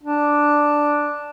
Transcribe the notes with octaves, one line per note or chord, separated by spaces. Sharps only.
D4